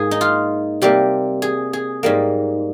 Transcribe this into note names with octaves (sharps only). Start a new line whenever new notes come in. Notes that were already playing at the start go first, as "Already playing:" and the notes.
Already playing: G#2 A#3 G#4
D#4
F4
C3 G3 A#3 G4
G#4
G#4
G#2 G3 A#3